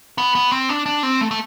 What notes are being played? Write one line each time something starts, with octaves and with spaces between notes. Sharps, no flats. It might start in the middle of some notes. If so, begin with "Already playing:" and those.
B3
B3
C4
D4
D4
C4
A3
A3